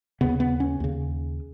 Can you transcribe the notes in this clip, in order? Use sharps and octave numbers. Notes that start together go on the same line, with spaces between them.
D#2 C#3 B3
B3
C#4
D#2 C#3